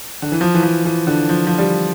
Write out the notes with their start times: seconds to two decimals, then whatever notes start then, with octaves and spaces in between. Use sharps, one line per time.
0.22 D3
0.32 E3
0.41 F3
0.54 E3
0.63 F3
0.85 E3
1.07 D3
1.29 F3
1.47 F3
1.58 G3